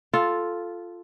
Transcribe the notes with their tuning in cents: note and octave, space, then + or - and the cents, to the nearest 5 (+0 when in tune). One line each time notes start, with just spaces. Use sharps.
F4 +0 A4 -5